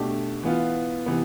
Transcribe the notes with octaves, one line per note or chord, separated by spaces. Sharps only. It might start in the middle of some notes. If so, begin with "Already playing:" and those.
Already playing: B2 A3 D4 G4
E3 B3 F4
C3 E3 B3